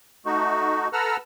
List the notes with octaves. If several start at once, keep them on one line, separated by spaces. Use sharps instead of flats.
A3 D#4 F#4
A4 B4 F#5 A#5 E6 F6